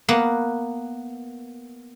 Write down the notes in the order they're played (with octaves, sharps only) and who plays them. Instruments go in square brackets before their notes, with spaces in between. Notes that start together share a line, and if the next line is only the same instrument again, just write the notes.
[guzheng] A#3 B3